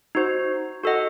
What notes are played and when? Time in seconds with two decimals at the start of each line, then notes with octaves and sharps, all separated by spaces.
0.15 D#4 F#4 C5
0.83 F#4 A4 D#5 F#5